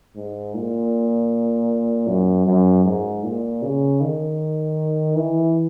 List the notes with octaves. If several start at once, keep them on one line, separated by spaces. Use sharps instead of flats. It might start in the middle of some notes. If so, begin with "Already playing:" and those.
G#2
A#2
F#2
F#2
G#2
A#2
C#3
D#3
E3